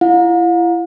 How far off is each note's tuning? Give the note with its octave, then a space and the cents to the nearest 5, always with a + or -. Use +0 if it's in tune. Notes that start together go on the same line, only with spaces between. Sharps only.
E4 +35 F5 +45